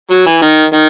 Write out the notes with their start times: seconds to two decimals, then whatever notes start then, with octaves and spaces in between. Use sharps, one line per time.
0.11 F#3
0.26 E3
0.42 D#3
0.73 D#3